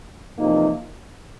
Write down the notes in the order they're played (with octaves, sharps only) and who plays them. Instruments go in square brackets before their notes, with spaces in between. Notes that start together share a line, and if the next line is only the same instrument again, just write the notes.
[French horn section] E2 C3 F3 A#3 D#4